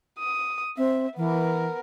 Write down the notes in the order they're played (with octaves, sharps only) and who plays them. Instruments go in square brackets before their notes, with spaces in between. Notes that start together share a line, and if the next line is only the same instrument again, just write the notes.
[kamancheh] D#6
[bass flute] C4 [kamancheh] E5
[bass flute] E3 [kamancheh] B3 A#4